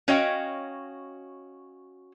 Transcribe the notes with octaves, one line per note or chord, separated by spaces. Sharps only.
C#4 F#4 C#5 D#5 F5 G5